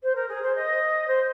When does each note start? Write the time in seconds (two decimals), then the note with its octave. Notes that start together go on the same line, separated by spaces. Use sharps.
0.03 C5
0.15 A#4
0.28 G#4
0.42 C5
0.55 D#5
1.07 C5